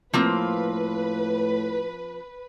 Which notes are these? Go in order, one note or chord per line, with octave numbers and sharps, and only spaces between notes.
A2 F3 A#3 C4 B4